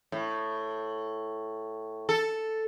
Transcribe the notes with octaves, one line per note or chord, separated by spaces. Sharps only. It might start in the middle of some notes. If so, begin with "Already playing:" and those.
A2
A4